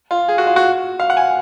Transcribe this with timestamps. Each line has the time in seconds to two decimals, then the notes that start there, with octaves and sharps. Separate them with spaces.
0.11 F4
0.28 G#4
0.38 F#4
0.47 F4
0.56 F#4
1.00 F5
1.10 F#5
1.17 G#5